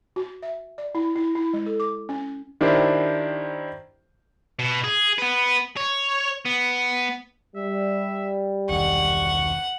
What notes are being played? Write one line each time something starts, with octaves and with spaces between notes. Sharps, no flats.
F#4
E5
D5
E4
E4
E4
G#3
A4
D6
C#4
D#3 D4 E4 G4 A#4 C5
B2
G#4
B3 B4
C#5
B3
G3 E5
E1 C2 D#3 F#5 C#6